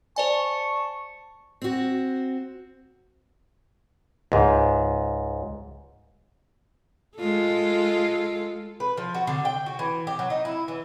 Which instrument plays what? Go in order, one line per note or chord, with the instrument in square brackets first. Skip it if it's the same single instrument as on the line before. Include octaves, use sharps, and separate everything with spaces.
[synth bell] C5 D5 G#5 [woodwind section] A5 C#6
[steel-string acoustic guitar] C4 F#4
[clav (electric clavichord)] C#2 G#2
[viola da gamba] G#3 F4 A4
[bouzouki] B4
F3
F#4
D3
G5
F#4
E3
G4
F#3
D#4
E4
E3